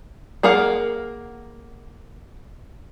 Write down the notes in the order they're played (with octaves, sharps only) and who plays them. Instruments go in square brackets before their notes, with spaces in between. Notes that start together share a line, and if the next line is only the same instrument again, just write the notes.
[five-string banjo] A#3 G#4 A#4 F5 F#5